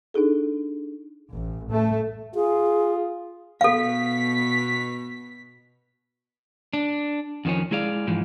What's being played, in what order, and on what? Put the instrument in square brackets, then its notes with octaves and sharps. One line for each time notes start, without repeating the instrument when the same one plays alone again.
[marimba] D4 D#4 G#4 A4
[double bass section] A1
A3
[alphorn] F4 [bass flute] G#4
[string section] B2 B6 [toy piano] A4 F5
[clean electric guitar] D4
F2 D#3 F3 C#4
G#3 E4 G#4 D5 F5
G#2 E3 F3